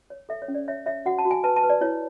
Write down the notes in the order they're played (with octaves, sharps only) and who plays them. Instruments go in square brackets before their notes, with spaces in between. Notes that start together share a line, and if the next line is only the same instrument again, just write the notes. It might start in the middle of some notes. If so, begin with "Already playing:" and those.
[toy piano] C#5
A4 E5
C#5
C#4
D5
C#5 E5
C#5 E5
F#4 F#5
A5
F#4
G#5
B4 A5
A5
B4
D5
E4 C#5